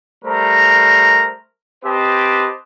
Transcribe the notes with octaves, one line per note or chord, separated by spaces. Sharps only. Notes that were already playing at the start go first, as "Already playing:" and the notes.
G3 A3 A#4 C5 A#5
C4 G4 B4 C5 D#5 A5